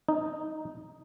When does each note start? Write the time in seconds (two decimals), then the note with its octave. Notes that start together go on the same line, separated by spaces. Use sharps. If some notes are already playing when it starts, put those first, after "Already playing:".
0.09 D#4